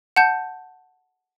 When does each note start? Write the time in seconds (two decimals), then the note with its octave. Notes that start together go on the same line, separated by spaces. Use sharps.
0.16 F#5 A5 G6